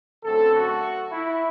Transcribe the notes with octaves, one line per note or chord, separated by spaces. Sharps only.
F#2 D3 A3 C4 A4
F#4
E4